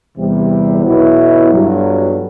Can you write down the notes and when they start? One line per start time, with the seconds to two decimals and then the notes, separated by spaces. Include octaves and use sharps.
0.17 E2 C3 G3
0.84 B1 B2 F#3 B3 E4
1.52 G1 G2 F#3